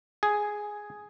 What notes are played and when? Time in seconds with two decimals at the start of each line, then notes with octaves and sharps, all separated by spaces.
0.23 G#4